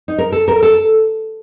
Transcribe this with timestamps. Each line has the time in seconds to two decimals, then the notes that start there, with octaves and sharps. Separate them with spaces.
0.08 D#4
0.18 A#4
0.32 A4
0.48 A#4
0.63 A4